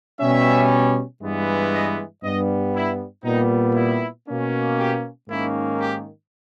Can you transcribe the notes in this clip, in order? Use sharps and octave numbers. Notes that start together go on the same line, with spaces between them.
B2 G3 C#4 E5
G2 E3 G#3 B3
D#5
G2 G3 B3 D#5
E4
A#2 G3 B3 D#4
E4
B2 A#3 C#4
G4
G#2 D#3 A#3 C#4 E4
G4